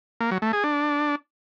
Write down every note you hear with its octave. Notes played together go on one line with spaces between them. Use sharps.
A#3
F#3
A3
G#4
D4